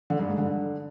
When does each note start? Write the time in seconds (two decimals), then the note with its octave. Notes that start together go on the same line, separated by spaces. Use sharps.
0.10 D3
0.19 G2
0.29 G#2
0.38 D3